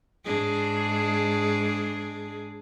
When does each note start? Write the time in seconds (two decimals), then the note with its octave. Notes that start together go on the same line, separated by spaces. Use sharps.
0.25 G#2 D4 G#4